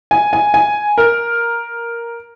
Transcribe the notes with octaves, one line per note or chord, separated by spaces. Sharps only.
G#5
G#5
G#5
A#4